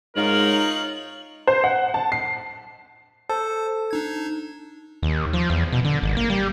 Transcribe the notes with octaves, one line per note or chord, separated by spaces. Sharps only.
G#2 D#4 F4 A#4 C#5 F#7
C5
F#5
A5
C7
A4 C5
D4 D#4 G#6
D#2
F3
E2
B2
D3
G#1
A#3
G3